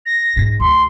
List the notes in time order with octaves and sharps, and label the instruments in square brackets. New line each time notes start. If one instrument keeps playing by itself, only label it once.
[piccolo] A#6
[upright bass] G#2
[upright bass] D2 [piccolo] C6